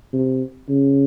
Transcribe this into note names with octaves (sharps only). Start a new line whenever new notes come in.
C3
C#3